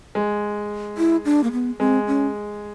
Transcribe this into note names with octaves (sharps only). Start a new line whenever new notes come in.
G#3
E4
D4
A#3
B3
G#3 C4
C#4